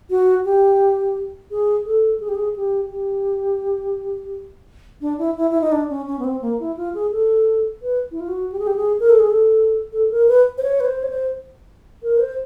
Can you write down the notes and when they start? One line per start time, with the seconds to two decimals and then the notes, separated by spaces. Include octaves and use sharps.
0.10 F#4
0.45 G4
1.51 G#4
1.86 A4
2.20 G#4
2.29 G4
2.35 G#4
2.56 G4
2.91 G4
5.01 D4
5.18 E4
5.37 E4
5.51 E4
5.61 D#4
5.72 D4
5.90 C#4
6.07 C#4
6.19 B3
6.24 C4
6.41 A#3
6.60 E4
6.77 F4
6.95 G#4
7.12 A4
7.82 B4
8.11 E4
8.20 F4
8.28 F#4
8.52 G4
8.59 G#4
8.67 G4
8.76 G#4
9.00 A#4
9.09 A4
9.20 G#4
9.30 A4
9.93 A4
10.11 A#4
10.28 B4
10.58 C5
10.63 C#5
10.80 B4
10.86 C5
11.03 C#5
11.10 C5
12.03 A#4
12.17 B4
12.20 C5